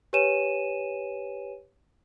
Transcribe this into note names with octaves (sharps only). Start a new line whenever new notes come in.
G4 B4 C#5 G#5 D#7 E7